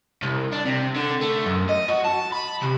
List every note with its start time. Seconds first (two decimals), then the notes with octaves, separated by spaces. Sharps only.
0.22 C2
0.53 D4
0.65 C3
0.95 D3
1.21 A3
1.46 F#2
1.69 D#5
1.89 F#4
2.05 A5
2.32 B5
2.62 C3